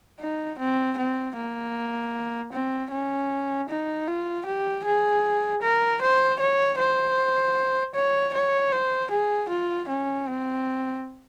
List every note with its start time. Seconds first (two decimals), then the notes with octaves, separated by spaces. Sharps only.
0.20 D#4
0.59 C4
0.98 C4
1.37 A#3
2.53 C4
2.91 C#4
3.69 D#4
4.08 F4
4.46 G4
4.85 G#4
5.62 A#4
6.02 C5
6.40 C#5
6.79 C5
7.95 C#5
8.34 C#5
8.72 C5
9.11 G#4
9.50 F4
9.89 C#4
10.27 C4